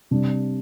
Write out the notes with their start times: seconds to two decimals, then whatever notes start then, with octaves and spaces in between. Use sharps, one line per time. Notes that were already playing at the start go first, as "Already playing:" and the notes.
0.11 C3 G3 D4